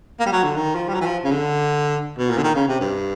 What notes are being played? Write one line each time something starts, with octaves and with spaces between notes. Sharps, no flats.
A#3
G3
F#3
D3
D#3
F3
G3
F#3
E3
F3
C#3
D3
B2
A#2
D3
D#3
C#3
C3
G2